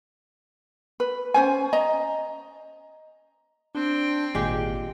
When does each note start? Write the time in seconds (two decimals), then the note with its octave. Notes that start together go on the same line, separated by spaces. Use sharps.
1.00 B4
1.34 C#4 C5 G#5
1.73 D#5 A#5
3.75 C4 D4 G5
4.35 G#1 A#2 G#3 G4